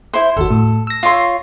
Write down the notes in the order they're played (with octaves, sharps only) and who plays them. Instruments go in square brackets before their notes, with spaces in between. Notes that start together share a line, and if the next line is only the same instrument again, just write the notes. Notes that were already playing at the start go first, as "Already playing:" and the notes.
[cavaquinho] E4 C5
[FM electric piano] G1 D#2 F#4 [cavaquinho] A4
[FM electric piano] A2
E6 A#6
[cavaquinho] F4 C#5 C6